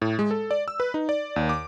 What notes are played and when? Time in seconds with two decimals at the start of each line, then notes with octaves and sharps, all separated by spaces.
0.02 A2
0.19 G#3
0.31 A4
0.51 D5
0.68 E6
0.80 B4
0.94 D#4
1.09 D5
1.36 D#2
1.49 D6